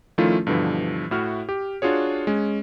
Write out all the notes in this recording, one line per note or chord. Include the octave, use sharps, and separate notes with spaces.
D#3 F3 A3 C#4 E4 F4
G2 B2 D3 E3 F3
A2 E4 F#4 F6
G4
D4 F4 F#4 G#4 C#5
G#3 C#4